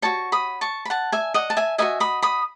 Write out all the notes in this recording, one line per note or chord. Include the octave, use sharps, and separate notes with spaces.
F#4 C#5 A5 C#6
B5 D#6
A5 C#6
B5
F#5 A5
E5 G#5
D#5 F#5
A5
E5 G#5
F#4 B4 D#5 E5 G#5
B5 D#6
B5 D#6